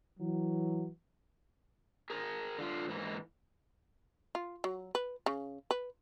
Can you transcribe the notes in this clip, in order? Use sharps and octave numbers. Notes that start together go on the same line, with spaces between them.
E3 F#3
G#4 A#4
D3 F4
G#2 E3 A#3
F4
F#3
B4
C#3
B4